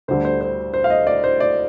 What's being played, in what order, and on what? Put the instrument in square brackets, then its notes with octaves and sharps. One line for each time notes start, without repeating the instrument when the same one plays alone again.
[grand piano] D2 D3 G3 C5
C5
C5
C5
F5
D#5
D5
C5
D5